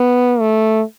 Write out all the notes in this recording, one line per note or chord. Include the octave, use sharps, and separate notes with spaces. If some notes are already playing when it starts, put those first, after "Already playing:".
Already playing: B3
A3